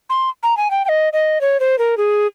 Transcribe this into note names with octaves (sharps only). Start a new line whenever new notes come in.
C6
A#5
G#5
G5
G5
D#5
D#5
C#5
C5
A#4
G#4